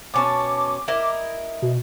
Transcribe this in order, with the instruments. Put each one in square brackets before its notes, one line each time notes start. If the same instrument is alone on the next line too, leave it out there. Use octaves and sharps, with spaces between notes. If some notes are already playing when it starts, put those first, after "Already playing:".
[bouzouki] B2 C#4 A5 [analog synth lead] D6
[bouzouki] E4 A#4 D#5
[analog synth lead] B2